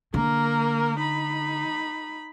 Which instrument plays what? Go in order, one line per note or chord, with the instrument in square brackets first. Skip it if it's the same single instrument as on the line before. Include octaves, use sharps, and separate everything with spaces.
[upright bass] D3 [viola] A#3 A#4
[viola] D#4 B5